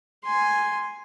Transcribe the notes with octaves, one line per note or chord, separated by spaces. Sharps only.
G#5 C6